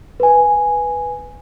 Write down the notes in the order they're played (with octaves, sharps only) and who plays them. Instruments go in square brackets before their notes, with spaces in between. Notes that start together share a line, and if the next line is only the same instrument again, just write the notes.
[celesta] B4 G#5